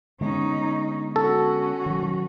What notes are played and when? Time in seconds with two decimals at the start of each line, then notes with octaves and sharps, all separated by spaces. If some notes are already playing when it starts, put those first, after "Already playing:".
0.21 D3 G#3 B3 C#4 D#4
1.16 C#4 F#4 A4
1.86 D#3 F#3